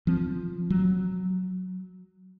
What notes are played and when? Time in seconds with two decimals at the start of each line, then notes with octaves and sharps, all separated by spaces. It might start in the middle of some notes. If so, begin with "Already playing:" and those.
0.07 F3 C4
0.70 F#3